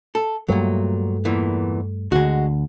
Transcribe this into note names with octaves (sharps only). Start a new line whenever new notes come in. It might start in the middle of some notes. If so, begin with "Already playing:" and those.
A4
G2 A#2 F#3 G3 A3
E2 A#2 E3
D2 D3 G#3 F#4